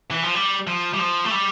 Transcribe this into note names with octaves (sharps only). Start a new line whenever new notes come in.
E3
F3
G3
F3
G3
F3
A3
G3